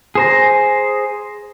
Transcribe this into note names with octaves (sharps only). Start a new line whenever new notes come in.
G#4 C5 A#5